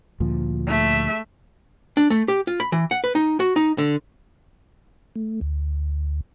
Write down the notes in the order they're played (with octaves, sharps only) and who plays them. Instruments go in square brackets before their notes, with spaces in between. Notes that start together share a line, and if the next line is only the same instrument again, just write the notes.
[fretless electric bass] D2 A#2 F3
[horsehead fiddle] A3 E5
[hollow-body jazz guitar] D4
A3
G4
F4
B5
E3
F#5
B4
D#4
F#4
D#4
D3
[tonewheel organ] A3
D2